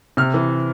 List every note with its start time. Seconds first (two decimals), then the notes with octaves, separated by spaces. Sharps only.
0.17 C3 F6
0.34 E3